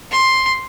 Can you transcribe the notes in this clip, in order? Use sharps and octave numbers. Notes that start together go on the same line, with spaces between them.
C6